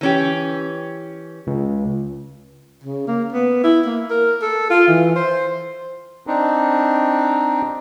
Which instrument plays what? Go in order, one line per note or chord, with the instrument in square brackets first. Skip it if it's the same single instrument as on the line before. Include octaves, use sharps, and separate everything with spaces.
[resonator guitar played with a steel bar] E3 C#4 G4
[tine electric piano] C#2
[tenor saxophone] C#3
A#3
B3
E4
A#3
A#4
A4
F4
E3
C5
[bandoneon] C4 D4 D#4